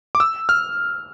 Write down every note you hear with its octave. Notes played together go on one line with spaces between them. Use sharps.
D6
E6
F6